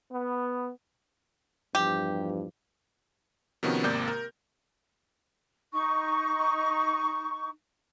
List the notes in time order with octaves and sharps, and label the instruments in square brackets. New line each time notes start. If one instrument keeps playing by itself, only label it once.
[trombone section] B3
[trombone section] E2 G2 F3 [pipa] G4
[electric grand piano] C3 D#3 F3 B3 C#4 F#4
G#1 C3 A#3 G4 D5 G6
A#4
[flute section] D#4 C#6